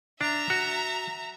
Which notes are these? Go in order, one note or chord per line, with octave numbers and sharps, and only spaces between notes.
D4 E5 A#5
F#4